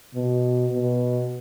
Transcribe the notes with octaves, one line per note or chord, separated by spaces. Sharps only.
B2
B2